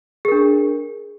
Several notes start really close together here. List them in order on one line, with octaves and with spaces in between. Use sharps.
G#4 A#4 D4